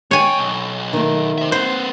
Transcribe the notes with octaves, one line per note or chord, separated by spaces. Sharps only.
G#3 C#5 G5 G#5
B1
D#3 A3
C5 E5
C4 B4 C5